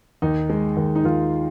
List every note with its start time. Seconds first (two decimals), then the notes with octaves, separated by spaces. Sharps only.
0.22 D#2 D#4
0.50 G#3
0.77 D#2
0.96 D#4
1.05 D#2 F4